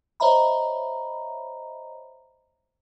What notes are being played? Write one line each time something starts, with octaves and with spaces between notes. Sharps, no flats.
C5 C#5 D#5 E5 A#5 B5